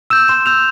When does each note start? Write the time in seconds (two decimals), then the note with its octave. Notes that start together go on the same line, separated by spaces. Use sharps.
0.10 E6 G6 E7
0.28 C6 E7
0.46 E6 G6 F7